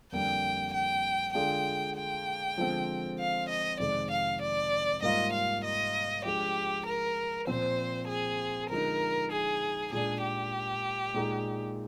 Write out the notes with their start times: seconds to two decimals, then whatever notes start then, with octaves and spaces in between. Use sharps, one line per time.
0.12 F2 D3 G3 A#3 G5
0.73 G5
1.34 D3 G#3 D4 F4 G#4 G5
1.96 G5
2.57 D3 F3 G#3 C4
3.19 F5
3.48 D#5
3.79 F2 C3 D#3 G#3 D5
4.10 F5
4.41 D5
5.02 G#2 G3 A#3 F4 D#5
5.32 F5
5.64 D#5
6.25 F3 G#3 D4 G4 G#4
6.86 A#4
7.47 A#2 F3 C4 C5
8.08 G#4
8.69 D3 F3 G#3 D#4 A#4
9.31 G#4
9.92 A#2 G#3 D4 G#4
10.23 G4
11.14 A#2 G#3 D#4 G#4